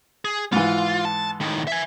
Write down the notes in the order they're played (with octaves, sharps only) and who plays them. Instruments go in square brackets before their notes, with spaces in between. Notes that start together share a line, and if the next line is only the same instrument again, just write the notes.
[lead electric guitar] G#4
[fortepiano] G#2 E3 [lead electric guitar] F4
[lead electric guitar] A5
A2 D#3
E5 G#5